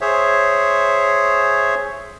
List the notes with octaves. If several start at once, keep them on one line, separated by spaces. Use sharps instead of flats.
G#4 C5 C#5 E5